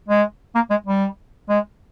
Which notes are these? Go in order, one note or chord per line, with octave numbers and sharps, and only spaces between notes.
G#3
A#3
G#3
G3
G#3